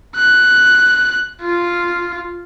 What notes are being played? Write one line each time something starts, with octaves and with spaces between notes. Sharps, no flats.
F#6
F4